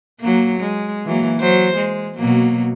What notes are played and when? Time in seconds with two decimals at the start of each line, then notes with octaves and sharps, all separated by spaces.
0.20 F#3 A#3
0.60 G#3
1.06 E3 F#3 A#3
1.38 F#3 C5
1.76 G#3
2.17 B2 F#3 A#3